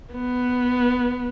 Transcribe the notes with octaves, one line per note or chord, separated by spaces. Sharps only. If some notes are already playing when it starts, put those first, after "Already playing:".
B3